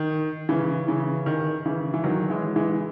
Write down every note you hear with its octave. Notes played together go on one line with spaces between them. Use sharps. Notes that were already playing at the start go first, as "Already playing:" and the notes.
Already playing: D#3
C#3 E3
C#3 E3
D#3
C#3 E3
E3
D#3 F#3
E3 G#3
E3 G#3